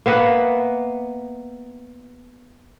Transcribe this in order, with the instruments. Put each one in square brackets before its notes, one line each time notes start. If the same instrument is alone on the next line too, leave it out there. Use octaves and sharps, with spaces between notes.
[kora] A#3 B3 E5 F#5